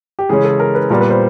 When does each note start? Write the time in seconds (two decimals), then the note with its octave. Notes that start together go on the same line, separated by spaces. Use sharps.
0.19 G4
0.29 C#3 E3 G#3 C#4 G#4
0.44 A4
0.60 A#4
0.75 B4
0.90 A#2 G3 B3 A#4
1.01 B4
1.10 C5